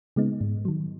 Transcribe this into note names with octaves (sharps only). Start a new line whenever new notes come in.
C#3 G#3 B3 D#4
G#2
D#3 F#3